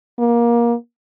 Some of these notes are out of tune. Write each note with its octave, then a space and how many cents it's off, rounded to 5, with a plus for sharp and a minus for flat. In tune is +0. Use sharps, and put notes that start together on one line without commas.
A#3 +20